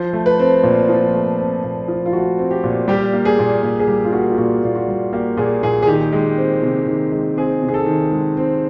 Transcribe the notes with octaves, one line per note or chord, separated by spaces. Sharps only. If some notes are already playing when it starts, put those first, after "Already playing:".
Already playing: F3 C5
A3
B4
C4
A#2
F3
A3
C4
A#2
F3
F4
A3 F#4
C4
G4
A#2
G3 G4
A#3
G#4
A#2
A#2
G#4
G3 G4
F4
A#3 F#4
F4
A#2 F#4
A#2 F4
F#4
G3
A#3 G4
A#2 G#4
A#2 G#4
G#4
D#3 G4
G#3
C4
C3
D#3
G#3
C4 G#4
C3
G#4
A4
D#3
G#3
C4